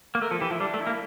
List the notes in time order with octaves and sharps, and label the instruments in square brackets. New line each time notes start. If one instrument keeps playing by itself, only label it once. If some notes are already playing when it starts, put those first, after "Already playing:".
[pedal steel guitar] A#3
[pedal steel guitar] A3 [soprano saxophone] A#4
[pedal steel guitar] F3 [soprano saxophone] A4
[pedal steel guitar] E3 [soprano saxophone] G4
[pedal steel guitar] F3 [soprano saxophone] E4
[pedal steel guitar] G3 [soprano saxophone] D4
[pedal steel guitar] A3
[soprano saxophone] E4
[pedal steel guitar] A#3